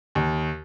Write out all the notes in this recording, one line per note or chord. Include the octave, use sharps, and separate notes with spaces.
D#2